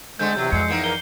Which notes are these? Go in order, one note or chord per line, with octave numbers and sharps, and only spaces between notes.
D3 G#3 A3 C4 G6
E2 C3 F#3
F2 G#3 C7 C#7
E2 A#3 D#4
A#4 G7